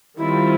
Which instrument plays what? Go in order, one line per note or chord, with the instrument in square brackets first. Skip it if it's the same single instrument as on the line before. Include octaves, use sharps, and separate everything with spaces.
[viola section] D#3 G3 C4 F4 [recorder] E4